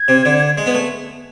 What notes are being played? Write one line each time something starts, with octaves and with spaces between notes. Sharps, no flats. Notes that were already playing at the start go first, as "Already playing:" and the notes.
Already playing: G#6
C3
D3
G#3
B3
A3